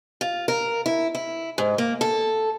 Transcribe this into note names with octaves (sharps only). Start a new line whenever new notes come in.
F4
A#4
E4
E4
G#2
A#3
A4